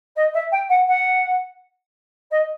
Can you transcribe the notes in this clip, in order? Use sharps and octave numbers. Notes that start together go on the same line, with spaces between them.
D#5
E5
G5
F#5
F#5
D#5